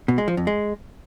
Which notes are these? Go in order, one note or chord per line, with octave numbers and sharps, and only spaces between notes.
B2
G#3
F3
F2
G#3